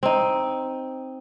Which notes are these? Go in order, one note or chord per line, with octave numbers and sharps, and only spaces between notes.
C4 D#4